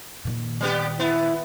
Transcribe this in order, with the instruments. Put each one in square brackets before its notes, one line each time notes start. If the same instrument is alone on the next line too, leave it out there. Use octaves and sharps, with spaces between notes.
[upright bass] A#2 D#3
[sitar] G3 B3 G4
[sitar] B3 [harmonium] E4